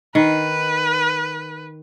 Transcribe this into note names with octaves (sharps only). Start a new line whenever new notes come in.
D#3 B4